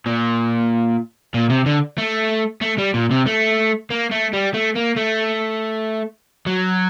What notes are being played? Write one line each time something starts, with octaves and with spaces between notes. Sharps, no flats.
A#2
A#2
C3
D3
A3
A3
G3
A#2
C3
A3
A#3
A3
G3
A3
A#3
A3
F#3